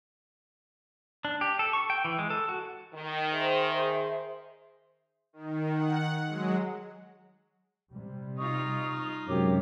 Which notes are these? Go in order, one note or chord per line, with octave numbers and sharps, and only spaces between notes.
D4
G4
A4
C#6
G5
E3
G#3
A4
F#4
D#3
G#4 C5 E5
D#3
F#5
F#3 G#3
C3 G3
D#4 F4 D#5 C#6 D#6
F#2 C3 F#3 G#3 G4 C#5 D6